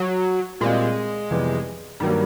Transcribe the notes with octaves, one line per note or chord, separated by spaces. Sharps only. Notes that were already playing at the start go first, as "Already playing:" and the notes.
Already playing: F#3
A#2 G3 G#3 C4 F4
F2 C3 E3 G3 B3
G2 D#3 F#3 G3 A#3